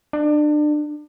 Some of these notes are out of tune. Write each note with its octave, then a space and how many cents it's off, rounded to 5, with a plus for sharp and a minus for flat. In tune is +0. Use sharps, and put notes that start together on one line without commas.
D4 +30